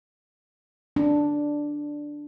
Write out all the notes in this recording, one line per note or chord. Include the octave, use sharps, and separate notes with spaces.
D4